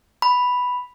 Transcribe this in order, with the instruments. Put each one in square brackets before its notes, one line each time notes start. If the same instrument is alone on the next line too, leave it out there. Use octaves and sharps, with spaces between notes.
[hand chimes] B5